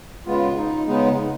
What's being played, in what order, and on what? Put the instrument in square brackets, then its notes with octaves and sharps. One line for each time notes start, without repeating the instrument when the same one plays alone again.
[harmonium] C#3 G#3 B3 F4
D#4
C#3 G#3 B3 D#4